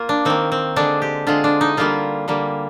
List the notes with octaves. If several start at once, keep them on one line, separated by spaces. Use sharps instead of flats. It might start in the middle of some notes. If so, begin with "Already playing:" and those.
Already playing: A#3 F4
D4
D#3 A#3 C4
C4
D3 G#3 D4
G4
D3 G#3 F4
D4
D#4
D3 G3 A#3 F4
D3 G3 A#3